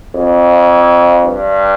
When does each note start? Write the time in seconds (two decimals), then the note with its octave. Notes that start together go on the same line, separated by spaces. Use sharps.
0.16 F2
1.23 G2